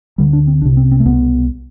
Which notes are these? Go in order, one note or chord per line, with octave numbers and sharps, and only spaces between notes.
D2 D3 G3
D4
C4
C2 C3 D4
C4
C4
A3
C2 B2 B3